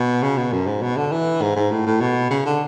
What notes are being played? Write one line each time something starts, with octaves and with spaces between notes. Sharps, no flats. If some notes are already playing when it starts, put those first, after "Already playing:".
Already playing: B2
C#3
B2
F#2
G#2
B2
D3
E3
G#2
G#2
A2
A2
B2
C#3
D3